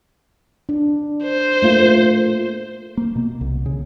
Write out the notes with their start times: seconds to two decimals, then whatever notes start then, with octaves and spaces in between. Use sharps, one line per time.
0.69 D4
1.25 C5
1.62 A3 A#3 F4
2.97 A#3
3.15 B2
3.41 C2
3.66 C#3